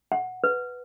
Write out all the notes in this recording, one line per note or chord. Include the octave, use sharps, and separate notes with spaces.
F#5
B4